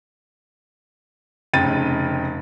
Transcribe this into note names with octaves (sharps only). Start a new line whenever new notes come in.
F1 C#3 G5 A6 D#7